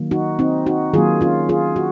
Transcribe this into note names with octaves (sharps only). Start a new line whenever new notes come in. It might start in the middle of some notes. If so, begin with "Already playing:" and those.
Already playing: D#3 F#3 A#3
D#4 F#4
C4 D#4
D#4 F#4
D#3 F#3 A#3 F4 G#4
C#4 F4
F4 G#4
F#4